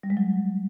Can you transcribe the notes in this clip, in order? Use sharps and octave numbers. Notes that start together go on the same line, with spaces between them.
G3
G#3
F#3